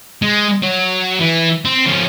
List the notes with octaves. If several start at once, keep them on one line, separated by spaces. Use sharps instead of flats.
G#3
F#3
E3
C4
F3 C#4